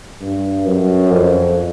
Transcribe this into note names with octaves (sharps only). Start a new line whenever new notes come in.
G2
F#2
F2